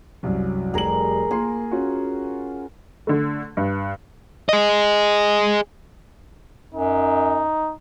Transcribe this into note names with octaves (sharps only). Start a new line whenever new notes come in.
C2 F#2
F1 G3 G#4 A#4 F#7
A#3 G#4 C6
C#4 F4 F#4
D3 A3
G2
G#4 D#5
F#2 D#4